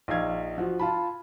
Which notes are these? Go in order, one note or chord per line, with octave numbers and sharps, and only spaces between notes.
A#1 F3 D#4 F5 G#6
F3 F#4
F4 A5 B5